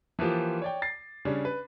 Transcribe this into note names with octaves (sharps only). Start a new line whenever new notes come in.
E3 F3 A#3 F4 G4
C#5 D5 G5
A6 C7
C#3 G3 C#4 D4
B4